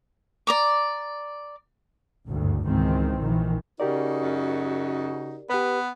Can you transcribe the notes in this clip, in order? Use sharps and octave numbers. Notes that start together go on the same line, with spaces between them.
D5 A#5 D6
F#1 D2 G2
C#2 G#2 D#3 E3 C4
A#1 D#3 E3
C#3 D#4 F#4 G4 A#4 D5
F#2
B3 G4 B4